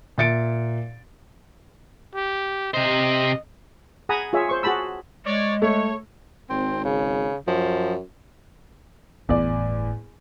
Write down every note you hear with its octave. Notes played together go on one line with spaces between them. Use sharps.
A#2 E5 A6 C#7 D7
G4
C3 C5 D#5
G#4 F#5 G#5 A#5 B5 D#6
F4 G#4 C#5 E5
C5 C#6
F#4 G#4 A5 B5 E6
G#3 C#5 D5
A3 C#5
G#1 C4
C#3
F#2 F3
G1 E2 A2 D5